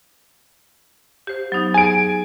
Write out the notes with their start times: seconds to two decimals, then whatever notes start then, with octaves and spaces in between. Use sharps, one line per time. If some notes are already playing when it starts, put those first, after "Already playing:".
1.27 G4 C5
1.52 F#3 B3 D#4
1.74 G#4 G#5 D7